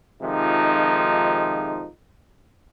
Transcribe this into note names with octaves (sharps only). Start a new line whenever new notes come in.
F2 C3 D#3 F3 G#3 D#4